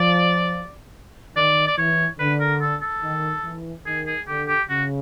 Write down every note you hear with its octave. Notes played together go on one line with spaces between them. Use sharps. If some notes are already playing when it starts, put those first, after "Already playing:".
Already playing: F3 D5
D#3 D5
D5
E3 C#5
D3 B4
A#4
A4
A4
D#3
E3
D#3 G#4
G#4
D3 G4
G4
C#3 F#4